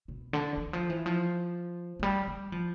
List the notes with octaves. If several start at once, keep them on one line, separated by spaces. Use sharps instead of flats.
B2
D3
E3
F3
E3
F3
F3
G3
G3
F3